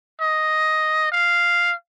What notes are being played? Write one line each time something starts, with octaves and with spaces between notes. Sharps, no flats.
D#5
F5